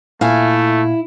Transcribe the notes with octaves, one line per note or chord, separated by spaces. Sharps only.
A#2 A3 E4 F5 G#5